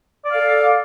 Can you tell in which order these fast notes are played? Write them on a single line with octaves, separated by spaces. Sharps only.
D5 F5 A4